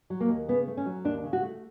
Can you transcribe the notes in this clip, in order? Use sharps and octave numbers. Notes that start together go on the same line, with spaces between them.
F#3
A#3
D#2
C#3 B3
A3
C#4
F#3
D#2 D4
C#3
F#4
A3